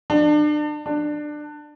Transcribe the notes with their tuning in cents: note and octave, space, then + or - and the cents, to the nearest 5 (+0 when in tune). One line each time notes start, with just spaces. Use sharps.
D4 +35
D4 +20